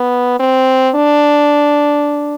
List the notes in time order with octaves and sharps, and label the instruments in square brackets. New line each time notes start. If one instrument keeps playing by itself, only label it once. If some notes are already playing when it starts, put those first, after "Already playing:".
Already playing: [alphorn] B3
C4
D4